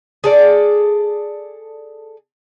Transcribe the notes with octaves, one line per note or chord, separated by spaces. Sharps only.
G#4 A4 D5